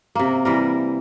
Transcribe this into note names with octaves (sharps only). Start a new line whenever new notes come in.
C3 A#3
E3 G3 A#4